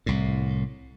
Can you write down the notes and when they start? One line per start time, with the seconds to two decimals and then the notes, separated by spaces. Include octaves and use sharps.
0.06 C2 A2